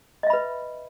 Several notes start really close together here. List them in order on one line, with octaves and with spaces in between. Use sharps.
D#5 E5 B5 B4